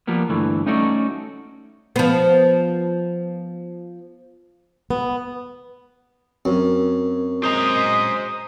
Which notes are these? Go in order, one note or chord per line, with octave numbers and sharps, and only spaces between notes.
F3 G3 A#3 B3
D2 G2 E3 A3
A3 C#4 D#4 F#4 A4 D5
F3 B3
B3
F#2 C4 A#4
G#3 C5 D#5 A#5 D#6